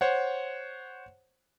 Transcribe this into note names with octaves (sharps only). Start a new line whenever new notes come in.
C5 C#5 F#5